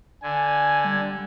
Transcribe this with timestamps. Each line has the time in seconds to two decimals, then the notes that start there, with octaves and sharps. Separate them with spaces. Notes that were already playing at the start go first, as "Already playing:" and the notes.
0.23 D3 G#5
0.84 G3